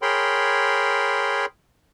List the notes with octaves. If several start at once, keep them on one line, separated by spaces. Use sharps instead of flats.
G#4 A#4 C#5 G5 B5 C6